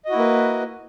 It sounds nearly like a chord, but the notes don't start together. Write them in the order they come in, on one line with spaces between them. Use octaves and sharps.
D#5 F#4 E4 A#3 B4